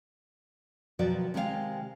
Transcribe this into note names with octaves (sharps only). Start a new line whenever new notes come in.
B2 D#3 F3 F#3 F#4 D5
C3 D#3 G#3 G4 B4 F5